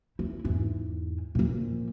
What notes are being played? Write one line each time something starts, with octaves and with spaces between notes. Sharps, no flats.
E4
E2 G#2
A#2 F3